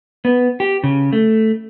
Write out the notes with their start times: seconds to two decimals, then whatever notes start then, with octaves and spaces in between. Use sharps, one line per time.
0.25 B3
0.60 G4
0.84 C#3
1.13 A3